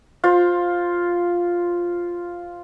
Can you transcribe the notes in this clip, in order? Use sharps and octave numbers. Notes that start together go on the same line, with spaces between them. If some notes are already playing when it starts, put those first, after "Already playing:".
F4 C5